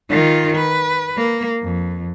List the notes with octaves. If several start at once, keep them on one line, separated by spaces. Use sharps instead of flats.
D#3 F4
B4
A#3
F2